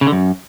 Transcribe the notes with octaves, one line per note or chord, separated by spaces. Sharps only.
C#3
D3
F#2